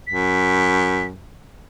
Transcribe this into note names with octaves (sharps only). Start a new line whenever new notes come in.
F#2 B6